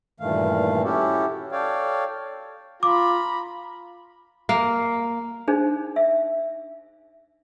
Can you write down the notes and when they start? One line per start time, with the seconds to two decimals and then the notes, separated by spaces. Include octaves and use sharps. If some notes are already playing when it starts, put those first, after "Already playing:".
0.20 G2 A#2 D#3 E3 A3 F5
0.84 C#4 E4 F#4 G4 A4
1.52 A4 C#5 D5 F5 G5
2.83 F4 A#5 B5 D6
4.49 A#3
5.48 D4 D#4 G#4 C5
5.96 E5